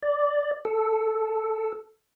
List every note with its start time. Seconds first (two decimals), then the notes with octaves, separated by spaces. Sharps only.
0.03 D5
0.65 A4